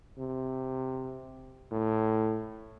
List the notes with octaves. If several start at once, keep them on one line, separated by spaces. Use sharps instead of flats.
C3
A2